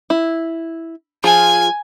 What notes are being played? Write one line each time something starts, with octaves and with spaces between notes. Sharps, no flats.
E4
F3 F4 G#4 G#5